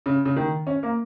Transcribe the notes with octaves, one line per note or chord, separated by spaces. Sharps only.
C#3
C#3
D#3
C#4
A#3